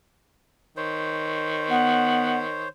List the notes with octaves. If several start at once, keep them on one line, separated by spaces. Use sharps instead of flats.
D#3 C5 C#5
B3 F#5